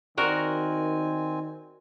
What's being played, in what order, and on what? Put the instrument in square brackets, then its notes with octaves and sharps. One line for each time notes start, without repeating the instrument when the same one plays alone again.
[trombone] D#3 [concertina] C4 G#5 [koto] F#4 A#4 [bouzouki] D5